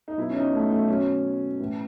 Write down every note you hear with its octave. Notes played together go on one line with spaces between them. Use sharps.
D#4
B2 F#3 E4
C#4
D#4
A3
A3
B2 F#3 C#4
A2 E3